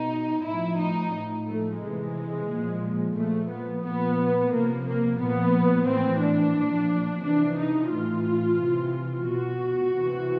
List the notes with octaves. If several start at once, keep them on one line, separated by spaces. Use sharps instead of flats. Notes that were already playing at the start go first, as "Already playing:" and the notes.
Already playing: B2 D#4
A2 F3 E4
D#4
A2 F3
A3
C3 E3 G#3
A#2 F3
A#2 F3 A3
B3
A#2 F3 B3
C3 F3 A#3
A#3
A#2 F3 B3
A2 E3 C4
D4
A#2 F3
C3 E3 D4
D#4
A2 E3 F4
C3 E3
B2 F#4
C3 E3